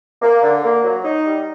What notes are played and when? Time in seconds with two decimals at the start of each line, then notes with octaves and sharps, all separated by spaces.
0.22 A#3
0.43 D3
0.63 A#3
0.84 F#3
1.04 D#4
1.25 G3